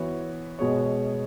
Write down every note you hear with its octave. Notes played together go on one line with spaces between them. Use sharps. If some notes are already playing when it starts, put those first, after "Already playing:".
Already playing: E3 B3 F#4 C#5
B2 G#3 B3 G#4 C#5